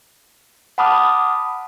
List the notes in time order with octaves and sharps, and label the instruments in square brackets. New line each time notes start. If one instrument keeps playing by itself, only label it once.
[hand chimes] F#5 A5 B5 D6 D#6 F6